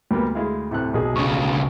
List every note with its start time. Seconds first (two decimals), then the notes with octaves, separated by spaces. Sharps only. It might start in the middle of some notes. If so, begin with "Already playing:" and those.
0.11 D2 G3 A#3 B3
0.35 G#3 E4 F5
0.71 A2 C3 F#6
0.94 B1 G#4
1.16 D2 C#3 C#6